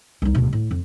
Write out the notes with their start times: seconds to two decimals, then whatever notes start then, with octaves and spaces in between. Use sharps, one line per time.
0.22 C2 D#4
0.35 D1 B2
0.53 A2
0.71 F2